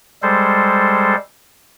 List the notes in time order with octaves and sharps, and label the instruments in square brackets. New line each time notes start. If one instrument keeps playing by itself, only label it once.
[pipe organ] G3 G#3 A4 C5